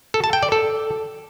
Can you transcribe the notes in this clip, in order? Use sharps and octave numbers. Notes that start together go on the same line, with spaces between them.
A4
A5
G5
D5
A4